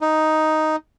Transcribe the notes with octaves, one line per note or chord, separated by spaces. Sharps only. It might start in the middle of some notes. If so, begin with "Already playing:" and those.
D#4